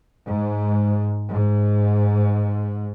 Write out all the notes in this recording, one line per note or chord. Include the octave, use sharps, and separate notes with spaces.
G#2
G#2